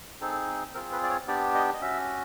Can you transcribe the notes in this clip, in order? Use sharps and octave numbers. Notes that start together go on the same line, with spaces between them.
C4 D#4 G#4 A4
C4 F4 G#4 A#4
B4
D5
C#5
B3 D4 G4 D5
D#5
D#5
C#4 F#4 E5